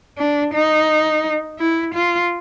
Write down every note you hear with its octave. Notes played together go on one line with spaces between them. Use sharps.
D4
D#4
E4
F4